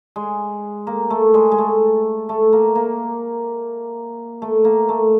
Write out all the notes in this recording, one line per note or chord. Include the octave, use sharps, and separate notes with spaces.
G#3
A#3
A3
G#3
G#3
A3
A3
A#3
A#3
A3
A#3
A3